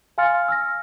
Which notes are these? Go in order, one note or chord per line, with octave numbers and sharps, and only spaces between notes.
F5 G#5 C6 F6 A6 C#7
E6 F6 A#6